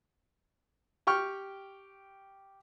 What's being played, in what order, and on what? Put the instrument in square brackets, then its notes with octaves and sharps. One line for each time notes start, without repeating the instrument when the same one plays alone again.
[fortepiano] G4 G5 C#6 F6